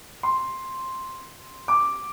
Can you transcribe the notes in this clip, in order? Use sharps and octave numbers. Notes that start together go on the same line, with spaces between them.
C6
D6